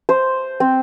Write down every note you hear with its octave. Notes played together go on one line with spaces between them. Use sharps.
C5
C4